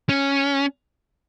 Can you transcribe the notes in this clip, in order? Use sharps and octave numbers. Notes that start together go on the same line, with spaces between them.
C#4